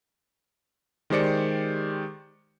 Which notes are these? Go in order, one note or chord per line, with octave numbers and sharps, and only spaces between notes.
D#3 G#3 G4 C5 D5 C#7